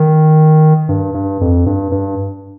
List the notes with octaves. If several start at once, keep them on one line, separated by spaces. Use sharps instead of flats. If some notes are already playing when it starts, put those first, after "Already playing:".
Already playing: D#3
G2
G2
F2
G2
G2